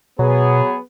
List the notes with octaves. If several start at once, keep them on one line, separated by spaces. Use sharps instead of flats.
B2 F#3 B3 G#4